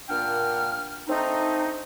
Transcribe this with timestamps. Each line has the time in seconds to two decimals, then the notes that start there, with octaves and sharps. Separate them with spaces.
0.09 A#2 A#3 D4 F#5 G5 F6
1.08 A3 C4 D4 D#4